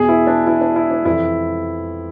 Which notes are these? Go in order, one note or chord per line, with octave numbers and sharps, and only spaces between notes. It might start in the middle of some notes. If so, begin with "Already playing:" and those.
Already playing: E2 B2 G#4
E4
D4
E4
D4
E4
D4
F2 C3 E3 E4